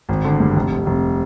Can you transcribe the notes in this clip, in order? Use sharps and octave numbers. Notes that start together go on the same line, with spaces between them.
G#1
D3
G2
F1
F1
F1